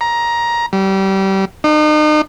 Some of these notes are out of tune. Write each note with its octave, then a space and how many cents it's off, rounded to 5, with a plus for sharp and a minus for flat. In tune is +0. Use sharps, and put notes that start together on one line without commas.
A#5 +15
G3 -25
D#4 -40